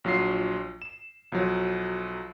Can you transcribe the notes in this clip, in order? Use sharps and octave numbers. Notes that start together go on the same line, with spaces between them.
A#1 F#3 F4 C7
E7
B1 F3 F#3